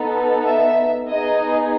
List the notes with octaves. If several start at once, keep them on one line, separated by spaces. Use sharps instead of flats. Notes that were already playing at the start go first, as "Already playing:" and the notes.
Already playing: B3 D#4 A4
E5
B3 D#4 G#4 D#5